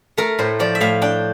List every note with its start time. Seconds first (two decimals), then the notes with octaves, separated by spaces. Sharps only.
0.17 A3 A#4
0.39 A2 C5
0.60 F3 D5
0.75 E5
0.81 A2 F5
1.02 D4 G5